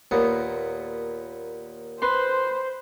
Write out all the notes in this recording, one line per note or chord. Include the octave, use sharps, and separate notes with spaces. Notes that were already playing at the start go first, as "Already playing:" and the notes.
D#2 A#2 B3
B4 C5 C6